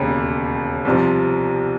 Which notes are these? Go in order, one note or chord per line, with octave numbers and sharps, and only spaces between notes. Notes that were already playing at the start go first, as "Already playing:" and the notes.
Already playing: E1 D#2 C#3
C2 C3 F3